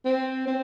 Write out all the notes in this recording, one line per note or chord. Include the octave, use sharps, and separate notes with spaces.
C4
C4